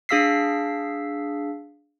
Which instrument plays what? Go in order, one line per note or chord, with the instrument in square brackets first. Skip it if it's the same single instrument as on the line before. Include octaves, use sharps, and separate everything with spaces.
[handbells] D4 G#4 F5 E6 B6 C7